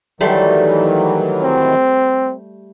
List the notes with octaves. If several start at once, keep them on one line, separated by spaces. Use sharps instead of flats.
D#3 E3 F#3 G3 A3 C6
C4